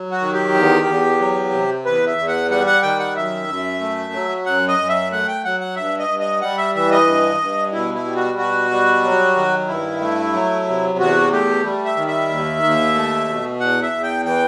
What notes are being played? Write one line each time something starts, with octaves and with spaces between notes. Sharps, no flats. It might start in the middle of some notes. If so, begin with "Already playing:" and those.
Already playing: F#3
F#4
D#3
G4
E2
E2
F#3
C3
E2 B4
E5
E2
F#5
G3 F#5
F#5
D#3 G5
F#5
F#2 E5
F#2
A3
F#3
F#2 F#5
D#5
F#2
E5
A3 F#5
G5
F#3 F#5
F#5
G2 E5
D#5
G2
D#5
G3 F#5
E5
E3 E5
D#5
G2
G2
B2 E4
E4
G3
F#4
B2 F#4
G3
F#3
D#3
G2 E4
A3
F#3
C3
E2 F#4
A3 G4
G3
E5
D#3
E5
D#2
D#2
A3
B2
E2 F#5
E5
E2
G5
E3 G5